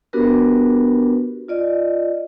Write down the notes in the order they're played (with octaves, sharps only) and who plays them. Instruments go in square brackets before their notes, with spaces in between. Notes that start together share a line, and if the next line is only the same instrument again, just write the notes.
[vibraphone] B3 D4 F#4 G4 A#4 B4
F4 D5 D#5